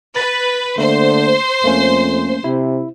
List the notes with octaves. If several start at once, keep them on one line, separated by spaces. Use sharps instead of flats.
B4 A6
D3 A3 A#3 C5
F2 A3 A#3 C#4
C3 E4